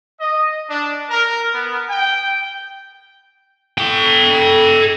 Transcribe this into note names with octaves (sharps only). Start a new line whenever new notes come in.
D#5
D4
A#4
B3
G5
A4 G5